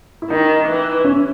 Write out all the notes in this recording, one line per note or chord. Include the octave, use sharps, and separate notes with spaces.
E4
D#3 D#4
E3
C#4